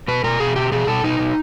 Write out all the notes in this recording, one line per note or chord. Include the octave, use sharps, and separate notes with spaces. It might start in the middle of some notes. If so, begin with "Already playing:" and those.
B2 B4
B2 A#4
B2 G#4
B2 G4
B2 G#4
B2 A4
B2 D#4
B2